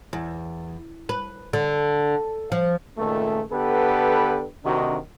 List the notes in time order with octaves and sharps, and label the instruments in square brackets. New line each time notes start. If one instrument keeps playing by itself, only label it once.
[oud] E2
B4
D3
F3
[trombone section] C#2 A#2 D#3 A3
D3 B3 G4 A4 B4
D2 C3 D#3 D4 D#4 F#4